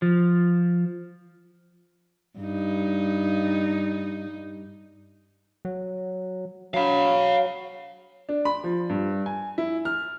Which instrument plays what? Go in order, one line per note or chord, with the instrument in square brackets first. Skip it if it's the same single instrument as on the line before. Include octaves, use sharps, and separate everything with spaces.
[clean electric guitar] F3
[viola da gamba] G2 D#4
[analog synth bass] F#3
[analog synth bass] F#3 [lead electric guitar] F5 B5
[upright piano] D4
B5
F3
G2
G#5
E4
F6